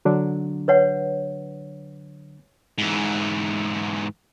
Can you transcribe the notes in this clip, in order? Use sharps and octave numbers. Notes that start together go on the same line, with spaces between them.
D3 F#3 D4
B4 C#5 F#5
G#2 E3